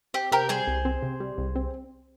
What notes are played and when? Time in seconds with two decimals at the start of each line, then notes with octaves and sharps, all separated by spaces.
0.14 C4 G4
0.32 C3 G4 A#4
0.49 G3 G#4 C5
0.68 C2
0.85 C4
1.03 C3
1.20 G3
1.38 C2
1.55 C4